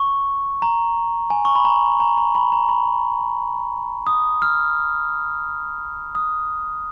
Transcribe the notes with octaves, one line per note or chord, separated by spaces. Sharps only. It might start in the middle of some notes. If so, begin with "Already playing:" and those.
Already playing: C#6
A#5
G#5
C#6
B5
A#5
A#5
A#5
B5
A#5
B5
D#6
F6
D#6